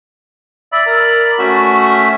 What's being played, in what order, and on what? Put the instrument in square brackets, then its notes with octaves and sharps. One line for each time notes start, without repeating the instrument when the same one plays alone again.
[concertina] D5 B5 [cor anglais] E5
[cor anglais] A#4
[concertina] A3 C#4 E5 [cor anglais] F#4